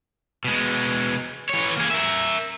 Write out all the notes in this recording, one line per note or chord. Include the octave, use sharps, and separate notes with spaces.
B2 G#3
E3 C#5
A#3 G#4
A#4 E5